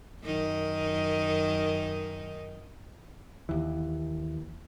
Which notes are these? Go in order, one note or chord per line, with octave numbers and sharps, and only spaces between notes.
F#2 D#3 D#4
D#2 E3